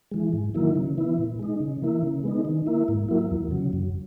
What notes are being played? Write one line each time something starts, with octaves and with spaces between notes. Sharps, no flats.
E3 G#3
G#2
D#3 F#3 A#3 E4
C#3
E3 B3 E4
A#2
G#3 D#4
C#3
E3 A#3 E4
C#3
G#3 B3 D#4
D#3
A#3 E4
G#2
F#3 A#3 E4
E2
C#3 F#3
F#2